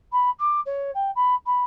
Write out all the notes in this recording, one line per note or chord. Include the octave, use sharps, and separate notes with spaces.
B5
D6
C#5
G5
B5
B5